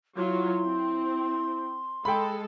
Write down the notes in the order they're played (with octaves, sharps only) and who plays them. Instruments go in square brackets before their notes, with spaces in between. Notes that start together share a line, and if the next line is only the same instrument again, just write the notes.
[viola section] F#3 F4 [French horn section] E4 [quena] C6
[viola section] C4
[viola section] G#3 A4 [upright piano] G5 B5